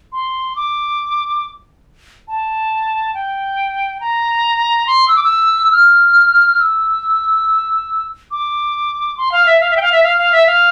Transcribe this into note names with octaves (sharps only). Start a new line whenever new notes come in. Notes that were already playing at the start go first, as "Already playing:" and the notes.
C6
D6
A5
G5
A#5
C6
E6
D6
E6
F6
E6
D6
C6
F5
E5
F5
E5
G5
F5
E5
F5
F5
E5
F5